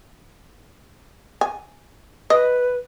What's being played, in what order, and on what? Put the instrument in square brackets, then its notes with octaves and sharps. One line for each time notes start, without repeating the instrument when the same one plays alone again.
[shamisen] G#5
[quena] B4 [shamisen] D#5